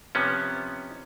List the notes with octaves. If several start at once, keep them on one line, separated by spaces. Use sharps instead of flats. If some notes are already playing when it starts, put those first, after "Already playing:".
C3 F3 B3 C#4